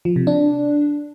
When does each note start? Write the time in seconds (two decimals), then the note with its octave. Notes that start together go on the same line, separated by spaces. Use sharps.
0.05 F3
0.16 C3
0.27 D4